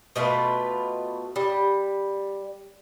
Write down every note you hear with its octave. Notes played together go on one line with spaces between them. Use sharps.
B2 A3 F4 B4
G3